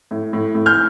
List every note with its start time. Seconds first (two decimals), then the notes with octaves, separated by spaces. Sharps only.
0.11 A2
0.33 A2
0.55 A2
0.66 F6 G6